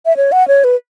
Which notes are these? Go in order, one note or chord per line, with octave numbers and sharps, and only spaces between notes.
E5
C#5
F#5
C#5
B4